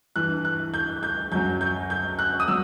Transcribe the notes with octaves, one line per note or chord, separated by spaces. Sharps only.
G2 E3 F#6
F#6
G6
G6
F#2 F#3 G6
G6
G6
F#6
D#6
F#3 E6